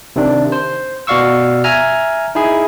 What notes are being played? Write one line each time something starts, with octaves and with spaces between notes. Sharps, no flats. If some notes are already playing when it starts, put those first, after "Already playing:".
C3 D#3 D4
C5
B2 F#4 D5 F5 C#6 E6
E5 G#5 A#5 F6
D#4 E4 G#4